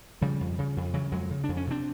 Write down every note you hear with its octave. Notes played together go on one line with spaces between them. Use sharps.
C#3 F3 G3
F2
C#3
F2
C#3 E3 F#3
F2 F#3 G#3
C#3
F2 D4
C#4
C3 C4 D4